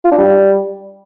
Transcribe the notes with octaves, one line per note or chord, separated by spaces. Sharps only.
F4
D4
G3